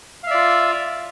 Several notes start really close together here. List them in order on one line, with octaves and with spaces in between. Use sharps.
F5 E5 D5 F4